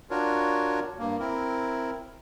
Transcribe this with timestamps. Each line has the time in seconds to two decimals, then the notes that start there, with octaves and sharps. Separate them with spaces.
0.10 D4 F4 F#4 A#4 C#5
0.98 G2 A#3
1.20 C4 E4 A#4